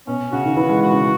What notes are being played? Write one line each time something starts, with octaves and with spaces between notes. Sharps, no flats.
B2 C#4
C#3 F#4
D#3
E3 B4
G#3
F#4
C#3